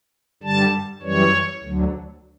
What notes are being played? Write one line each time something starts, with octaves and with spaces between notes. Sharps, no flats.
G2 D3 G3 A5
F#2 E3 G3 C#5
D2 D3 F#3